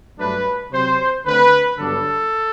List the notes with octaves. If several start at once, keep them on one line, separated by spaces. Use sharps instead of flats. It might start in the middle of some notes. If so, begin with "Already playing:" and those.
G2 F#3 A3 D4 B4
C3 F#3 C4 C5
D3 A3 C4 B4
G2 D3 F#3 B3 D4 A4